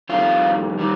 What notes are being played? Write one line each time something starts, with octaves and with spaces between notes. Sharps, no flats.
F2 D#3 G3 F4
D#3 G3